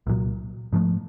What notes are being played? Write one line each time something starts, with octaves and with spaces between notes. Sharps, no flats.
C2 A#2 F#3
G#2 F3 A3